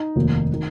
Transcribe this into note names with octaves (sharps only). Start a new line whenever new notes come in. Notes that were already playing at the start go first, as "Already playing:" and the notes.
Already playing: D#4
F1 D#2 D#3
D#3